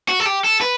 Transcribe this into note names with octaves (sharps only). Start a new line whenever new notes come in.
F#4
A4
G4
A4
B4